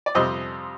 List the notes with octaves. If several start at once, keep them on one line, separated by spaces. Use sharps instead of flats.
D5
F2 C3 G3 C5 D#5